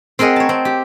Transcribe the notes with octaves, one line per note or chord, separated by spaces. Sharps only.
C4 G#4 A#4 D#5 F#5
C#5 A5
C4
G4